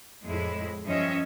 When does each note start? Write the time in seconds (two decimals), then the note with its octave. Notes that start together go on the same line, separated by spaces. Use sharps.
0.24 F2 A2 G#3 E4
0.85 G2 F3 C#4 D#5 E5